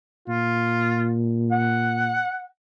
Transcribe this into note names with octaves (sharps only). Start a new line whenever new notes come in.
A#2 F4
F#5